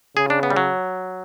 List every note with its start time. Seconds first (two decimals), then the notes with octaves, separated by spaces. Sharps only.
0.17 C#3 G#4
0.30 D4
0.43 B3
0.50 G3
0.56 F#3